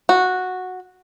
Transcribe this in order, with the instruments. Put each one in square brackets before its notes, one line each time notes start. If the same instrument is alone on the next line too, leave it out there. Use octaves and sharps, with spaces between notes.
[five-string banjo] F#4